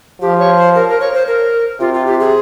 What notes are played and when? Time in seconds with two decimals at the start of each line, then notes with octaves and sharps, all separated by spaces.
0.22 F3 G4
0.39 C#5
0.57 C5
0.75 A#4
0.88 A#4
1.01 C#5
1.14 C5
1.27 A#4
1.80 C3 F4
1.94 F4
2.07 G4
2.20 G#4